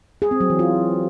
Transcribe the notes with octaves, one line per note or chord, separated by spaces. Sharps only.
G#4
C4
F#3
E3
F4